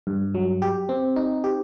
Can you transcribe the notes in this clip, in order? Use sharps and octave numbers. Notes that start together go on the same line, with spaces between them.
G2
F#3
G4
C4
D#4
G4